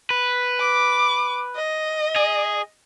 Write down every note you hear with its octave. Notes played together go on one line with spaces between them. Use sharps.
B4
D6
D#5
G#4